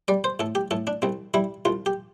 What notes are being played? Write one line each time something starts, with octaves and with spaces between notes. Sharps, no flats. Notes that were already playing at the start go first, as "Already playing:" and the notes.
G3 D5
C5
A2 A4
G4
A2 A4
D4
C2 C4
G3 E4
C2 F4
G4